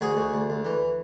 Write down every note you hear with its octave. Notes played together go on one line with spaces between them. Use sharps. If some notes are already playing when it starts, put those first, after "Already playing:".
D2 F#4 G#4
D2
D2
D2
E3